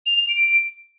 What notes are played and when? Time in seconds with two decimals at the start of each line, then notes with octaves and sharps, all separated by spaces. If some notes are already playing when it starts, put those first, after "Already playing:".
0.06 F7
0.17 F7
0.29 D7